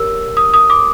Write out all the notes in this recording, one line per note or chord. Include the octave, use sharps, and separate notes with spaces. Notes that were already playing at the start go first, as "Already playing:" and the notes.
Already playing: G4 A#4 C#5 E6
D#6
D#6
D6